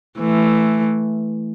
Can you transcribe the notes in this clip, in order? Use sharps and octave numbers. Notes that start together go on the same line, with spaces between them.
E3 A3